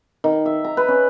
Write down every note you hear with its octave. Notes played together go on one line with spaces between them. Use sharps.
D#3
E5
A#5
B4
C#4